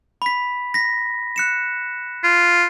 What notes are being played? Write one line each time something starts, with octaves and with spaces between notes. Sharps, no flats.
B5 B6
A#6 B6
F#6 C#7 E7
F4